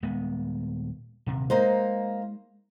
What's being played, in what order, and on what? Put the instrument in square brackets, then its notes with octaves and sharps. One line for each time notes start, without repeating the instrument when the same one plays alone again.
[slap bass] D#1 G#3 B3
D#1 C3
[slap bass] G#3 [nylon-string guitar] A#3 D#4 C5